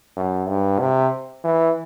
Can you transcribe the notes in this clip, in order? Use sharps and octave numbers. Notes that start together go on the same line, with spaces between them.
F#2
G2
C3
E3